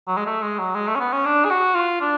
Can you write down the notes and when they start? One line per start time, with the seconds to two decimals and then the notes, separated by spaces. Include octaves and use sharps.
0.08 F#3
0.17 G#3
0.26 A3
0.42 G#3
0.59 F#3
0.75 G#3
0.88 A3
0.96 C#4
1.00 B3
1.13 C#4
1.25 D4
1.45 G#4
1.50 F#4
1.75 F4
2.01 D4